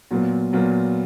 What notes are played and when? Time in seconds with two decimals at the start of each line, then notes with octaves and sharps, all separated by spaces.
0.11 A#2 F#3 B3 F4
0.53 A#2 F#3 B3 F4